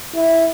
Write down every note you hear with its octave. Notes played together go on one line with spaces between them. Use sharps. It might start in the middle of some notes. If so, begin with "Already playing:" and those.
E4